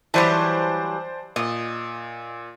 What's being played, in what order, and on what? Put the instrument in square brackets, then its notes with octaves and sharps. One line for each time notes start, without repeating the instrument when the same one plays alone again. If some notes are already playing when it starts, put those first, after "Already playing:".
[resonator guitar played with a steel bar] E3 F#3 G3 [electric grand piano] C5 D5 A5
[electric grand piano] A#2 [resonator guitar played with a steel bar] D#5